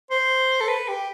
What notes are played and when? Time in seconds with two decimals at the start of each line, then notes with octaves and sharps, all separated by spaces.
0.11 C5
0.61 A4
0.68 B4
0.88 G4